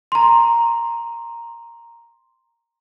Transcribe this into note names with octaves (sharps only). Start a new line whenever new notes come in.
A#5 C6